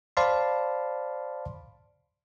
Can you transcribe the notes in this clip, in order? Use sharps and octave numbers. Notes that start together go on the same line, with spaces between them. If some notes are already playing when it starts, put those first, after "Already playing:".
C5 D5 F5 A5 B5 C6